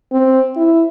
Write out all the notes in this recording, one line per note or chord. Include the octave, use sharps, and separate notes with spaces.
C4
E4